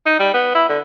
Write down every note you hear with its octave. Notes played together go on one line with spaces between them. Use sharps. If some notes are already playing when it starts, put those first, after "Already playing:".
D#4
G3
B3
E4
D3